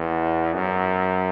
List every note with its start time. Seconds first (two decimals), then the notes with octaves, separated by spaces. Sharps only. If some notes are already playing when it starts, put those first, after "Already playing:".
Already playing: E2
0.54 F#2